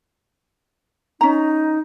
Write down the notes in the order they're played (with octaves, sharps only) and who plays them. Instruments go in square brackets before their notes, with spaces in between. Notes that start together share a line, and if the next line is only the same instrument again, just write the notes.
[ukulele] C#4 A#5 [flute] D#4